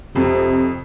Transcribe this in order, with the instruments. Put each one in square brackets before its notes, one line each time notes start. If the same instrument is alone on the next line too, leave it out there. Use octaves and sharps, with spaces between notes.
[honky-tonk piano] F2 [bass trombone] C3